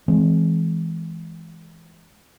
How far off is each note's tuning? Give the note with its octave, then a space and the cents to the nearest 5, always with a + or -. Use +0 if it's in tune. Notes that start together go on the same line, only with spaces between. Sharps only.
E3 +0 G#3 +20 C4 +0